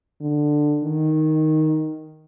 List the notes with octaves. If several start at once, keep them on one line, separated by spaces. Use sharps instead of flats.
D3
D#3